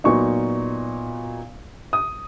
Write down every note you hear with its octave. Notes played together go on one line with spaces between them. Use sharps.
A#2 F#3 B3 D#4 C#6
D#6